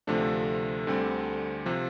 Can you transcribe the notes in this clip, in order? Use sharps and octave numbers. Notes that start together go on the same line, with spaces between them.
D2 C3 F3 A3 D4
D2 D3 G3 C4
C3 F3